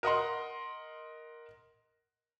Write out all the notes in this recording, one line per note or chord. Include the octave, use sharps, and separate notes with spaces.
A#4 D#5 F#5 C6